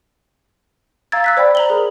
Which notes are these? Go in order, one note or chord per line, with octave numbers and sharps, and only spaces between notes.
F5 A#5 E6 G#6 A6
E6 F#6 B6
C5 D5 G5 B5
A#5 F#7 G7
G#4 A#4